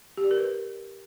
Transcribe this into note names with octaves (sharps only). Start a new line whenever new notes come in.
G4
D5
A#4
B4